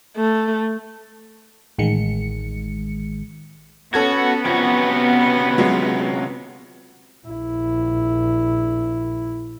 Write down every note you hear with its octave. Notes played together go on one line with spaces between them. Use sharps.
A3
A1 D#3 G#3 C#7
B3 C#4 F#4 A4 G#6
C3 F3 C#4 F#4
F#3 G#3 F4
A#1 E4